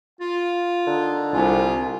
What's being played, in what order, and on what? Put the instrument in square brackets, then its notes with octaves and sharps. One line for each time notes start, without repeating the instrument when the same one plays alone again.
[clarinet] F4 [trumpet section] F5
[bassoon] D3 [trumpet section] D#4 A#4
[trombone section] C2 [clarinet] F4 [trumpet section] G#5